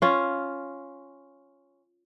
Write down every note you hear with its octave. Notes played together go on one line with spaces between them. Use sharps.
C#4 F4